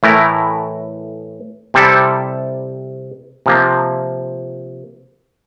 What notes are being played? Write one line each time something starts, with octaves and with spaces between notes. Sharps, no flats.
A2 E3 A3 E4 A#4
C3 G3 C4 E4 A4
C3 F3 A#3